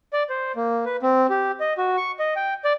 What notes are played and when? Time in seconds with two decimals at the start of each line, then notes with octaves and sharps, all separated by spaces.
0.13 D5
0.29 C5
0.56 A#3
0.85 B4
1.02 C4
1.30 G4
1.60 D#5
1.78 F#4
1.97 C#6
2.19 D#5
2.36 G5
2.65 D5